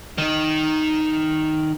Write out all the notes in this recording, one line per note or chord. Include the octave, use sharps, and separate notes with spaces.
D#3 D#4